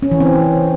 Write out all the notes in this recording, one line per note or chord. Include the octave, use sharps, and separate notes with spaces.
C#4
E3
C4